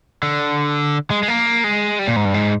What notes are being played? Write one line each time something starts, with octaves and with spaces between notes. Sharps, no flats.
D3
G#3
G#3
A#3
G#3
G3
A#2
G#2
G2
G#2